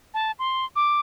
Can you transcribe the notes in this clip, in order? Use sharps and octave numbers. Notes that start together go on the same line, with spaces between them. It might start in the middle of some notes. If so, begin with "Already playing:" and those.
A5
C6
D6